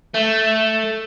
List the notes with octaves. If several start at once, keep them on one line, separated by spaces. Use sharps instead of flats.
A3